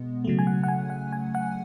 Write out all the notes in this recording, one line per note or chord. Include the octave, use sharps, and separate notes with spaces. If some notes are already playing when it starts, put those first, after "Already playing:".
Already playing: B2 G#3 B3
C#3 F#3 A3
G#5
F#5
F#5
G#5
F#5
G#5
F#5